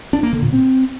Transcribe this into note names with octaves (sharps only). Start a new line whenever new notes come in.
D4
A#3
D3
A#2
C4